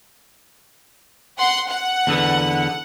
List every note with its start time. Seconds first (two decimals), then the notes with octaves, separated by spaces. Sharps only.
1.38 F#5 C6
1.69 F#5
2.07 E2 D3 B3